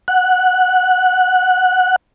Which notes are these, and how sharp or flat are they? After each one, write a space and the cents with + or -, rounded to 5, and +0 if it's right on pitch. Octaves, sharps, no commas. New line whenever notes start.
F#5 -5